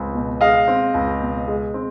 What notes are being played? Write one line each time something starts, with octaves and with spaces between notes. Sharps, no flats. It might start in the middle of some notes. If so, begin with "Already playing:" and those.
Already playing: C#2 C4
B2
G#3 D#5 F5
C4
C#2
B2
G#3
C4